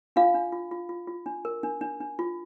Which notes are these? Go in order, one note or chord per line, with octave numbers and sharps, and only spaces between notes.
D4 F4 F5
D4
F4
F4
F4
F4
D4
A#4
D4
D4
D4
F4